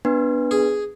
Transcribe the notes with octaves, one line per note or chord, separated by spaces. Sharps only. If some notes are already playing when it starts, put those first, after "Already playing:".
B3 D4 B4
G#4